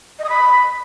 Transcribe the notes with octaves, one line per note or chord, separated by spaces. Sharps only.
D#5
D#6
B5